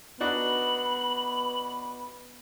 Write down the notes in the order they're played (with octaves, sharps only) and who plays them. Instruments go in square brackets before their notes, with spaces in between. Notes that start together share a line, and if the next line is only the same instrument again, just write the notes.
[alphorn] B3 [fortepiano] D4 D#4 F#4 [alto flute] B5 [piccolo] F#7